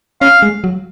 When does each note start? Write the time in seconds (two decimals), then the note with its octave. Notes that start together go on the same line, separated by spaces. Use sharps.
0.21 C#4 F5
0.42 G#3
0.64 F#3